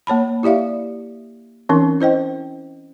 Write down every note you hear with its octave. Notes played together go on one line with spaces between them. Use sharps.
A#3 C#5 A5 B5
E4 G4 D5 E5 F5
E3 C4 C#4 D#4 A#4
E4 C5 D#5 G5